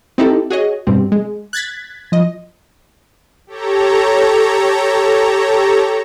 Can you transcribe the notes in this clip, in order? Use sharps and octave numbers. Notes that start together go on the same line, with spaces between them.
C4 D#4 E4 G4 A4
F#4 G#4 C#5 D#5
G2 B2 G3 C4
G#3
F#6 G#6 A6 B6
F3 D#5
G4 A4 C#5 A#5